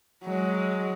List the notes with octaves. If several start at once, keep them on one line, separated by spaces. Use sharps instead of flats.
F#3 G#3